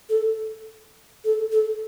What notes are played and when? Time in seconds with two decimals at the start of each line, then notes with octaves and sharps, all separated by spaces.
0.09 A4
1.24 A4
1.52 A4